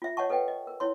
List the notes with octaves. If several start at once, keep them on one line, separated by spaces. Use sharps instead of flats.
F4 E5
C#5 D#5 F#5 A5 C#6
A4 B4 D#5 F#5 G5
D#5
A#4
E4 C#5 C6